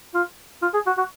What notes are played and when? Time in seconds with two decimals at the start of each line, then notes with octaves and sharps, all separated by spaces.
0.14 F4
0.62 F4
0.74 G#4
0.86 F#4
0.98 F#4